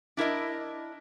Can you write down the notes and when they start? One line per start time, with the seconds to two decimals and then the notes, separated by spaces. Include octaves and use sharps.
0.17 D4 E4 A#4 D#5